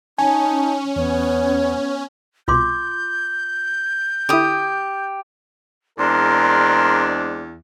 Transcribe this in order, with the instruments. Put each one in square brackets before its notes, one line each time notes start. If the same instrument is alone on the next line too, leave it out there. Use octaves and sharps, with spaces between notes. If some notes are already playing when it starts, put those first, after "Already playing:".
[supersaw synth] C#4 [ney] D#4 [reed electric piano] G#5 [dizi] A5
[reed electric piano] E2 [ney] B3 [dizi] C#5
[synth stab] C2 B2 [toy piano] F4 C6 D6 [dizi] G6
[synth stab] D3 E4 [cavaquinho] G4 D#6
[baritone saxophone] E2 [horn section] G#3 C4 D4 [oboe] A#4 [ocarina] C6